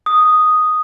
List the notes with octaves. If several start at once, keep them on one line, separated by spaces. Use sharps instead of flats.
D#6